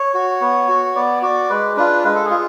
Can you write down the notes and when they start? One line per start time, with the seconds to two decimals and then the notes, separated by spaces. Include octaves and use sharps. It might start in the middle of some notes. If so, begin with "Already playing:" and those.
Already playing: C#5
0.14 F#4
0.41 B3
0.68 F#4
0.95 B3 D5
1.22 F#4 D5
1.50 G#3 B4
1.77 D4 F4 B4
2.04 G#3 B4
2.15 A4
2.25 G#4
2.30 F4